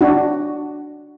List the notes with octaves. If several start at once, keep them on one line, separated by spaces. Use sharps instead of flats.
D4 F#4